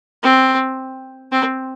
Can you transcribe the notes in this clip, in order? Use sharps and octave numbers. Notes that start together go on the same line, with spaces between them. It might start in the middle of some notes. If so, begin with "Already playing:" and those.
C4
C4